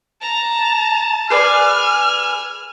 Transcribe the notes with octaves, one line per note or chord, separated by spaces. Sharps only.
A5 A#5
G#4 B4 D5 G#5 F6